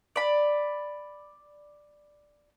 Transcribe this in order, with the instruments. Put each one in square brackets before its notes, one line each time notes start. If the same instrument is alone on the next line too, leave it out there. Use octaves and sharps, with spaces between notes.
[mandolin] D5 B5